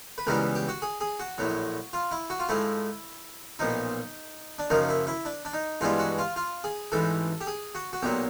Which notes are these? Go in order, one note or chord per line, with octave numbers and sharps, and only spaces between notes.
B4
C#2 C#3 E3 G3 B3 A#4
G4
F#4
G#4
G#4
F#4
A#1 A2 F#3
F4
E4
F#4
F4
G#2 F3 A3 E4
B1 A#2 F3 D#4
D4
F#2 C#3 F3 A#3 D#4
E4
E4
D4
D4
D#4
G2 E3 G#3 B3 D4 F4
F#4
F4
F4
G#4
A1 G#2 E3 A4
G4
G#4
F#4
F#4
B1 A#2 F#3 G4